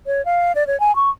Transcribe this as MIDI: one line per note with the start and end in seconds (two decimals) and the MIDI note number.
0.06 0.24 73
0.25 0.52 77
0.55 0.66 74
0.67 0.79 73
0.80 0.95 80
0.96 1.10 85